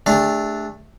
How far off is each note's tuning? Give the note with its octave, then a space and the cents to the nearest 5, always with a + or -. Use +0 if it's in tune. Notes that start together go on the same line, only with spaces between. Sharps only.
A3 -10 D4 +0 G4 +45